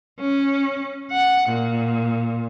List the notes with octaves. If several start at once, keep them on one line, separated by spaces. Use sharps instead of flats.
C#4
F#5
A#2